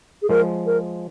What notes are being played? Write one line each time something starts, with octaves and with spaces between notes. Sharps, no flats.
G#4
F3 G#3 A#4
A#4